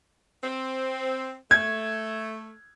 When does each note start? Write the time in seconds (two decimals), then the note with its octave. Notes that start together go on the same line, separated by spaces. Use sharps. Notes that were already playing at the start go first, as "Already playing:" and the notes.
0.43 C4
1.51 A3 G#6